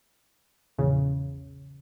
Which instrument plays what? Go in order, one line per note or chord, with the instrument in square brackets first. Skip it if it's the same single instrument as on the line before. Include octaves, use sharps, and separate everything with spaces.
[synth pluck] A#1 E2 C#3